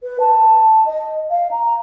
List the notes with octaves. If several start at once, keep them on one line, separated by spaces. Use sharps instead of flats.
B4
A5
D#5
F5
A#5